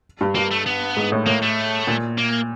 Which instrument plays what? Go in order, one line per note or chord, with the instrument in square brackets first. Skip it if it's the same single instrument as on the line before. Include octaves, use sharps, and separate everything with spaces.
[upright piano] G2
[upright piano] G2 [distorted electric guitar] A#3
[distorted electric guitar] A3
B3
[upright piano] G#2
A2
[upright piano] A2 [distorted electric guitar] A#3
[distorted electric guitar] A3
[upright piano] A#2
[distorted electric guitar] A#3